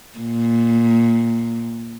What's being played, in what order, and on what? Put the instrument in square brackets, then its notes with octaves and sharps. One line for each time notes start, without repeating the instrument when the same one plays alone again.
[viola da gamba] A#2